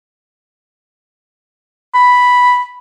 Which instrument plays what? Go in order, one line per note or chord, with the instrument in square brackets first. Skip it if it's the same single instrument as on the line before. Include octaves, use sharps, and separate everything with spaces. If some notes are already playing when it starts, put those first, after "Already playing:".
[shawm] B5